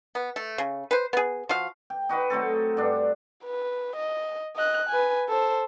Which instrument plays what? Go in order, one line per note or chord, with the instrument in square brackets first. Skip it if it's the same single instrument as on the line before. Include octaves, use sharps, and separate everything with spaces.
[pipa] B3
A3
C#3
B4 C5
B3 G#4
F3 F#4 F5
[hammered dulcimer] G5
D#4 F#4 B4 D#5
F#3 A3 C4 A4
G2 D4
[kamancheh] B4
D#5
D#5 F#6
B4 G#5
A4 C5